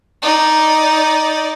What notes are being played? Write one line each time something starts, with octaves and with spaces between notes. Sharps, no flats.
D#4 D5